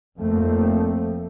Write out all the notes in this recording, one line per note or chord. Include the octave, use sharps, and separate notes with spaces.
F1 F2 F3 A3 A#3 C4